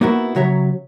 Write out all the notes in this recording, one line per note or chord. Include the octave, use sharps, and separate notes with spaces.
A#3 B3 D#4 E4 F#4 A#4
C#3 F#3 F#4 C#5 E5 A#5